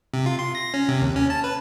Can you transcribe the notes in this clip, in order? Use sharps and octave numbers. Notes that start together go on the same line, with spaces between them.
C3
F4
C6
A#6
C#4
C3
D#2
C#4
A5
B4